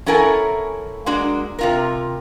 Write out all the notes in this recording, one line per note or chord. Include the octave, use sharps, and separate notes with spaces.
C#4 E4 A4 A#4 F#5 G#5
G#3 A#3 D4 F#4
C3 F4 A#4